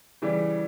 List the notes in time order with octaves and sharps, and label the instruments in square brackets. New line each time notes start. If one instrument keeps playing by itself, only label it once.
[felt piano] C#3 E3 G3